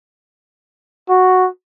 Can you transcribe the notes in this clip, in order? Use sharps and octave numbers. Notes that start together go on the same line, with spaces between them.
F#4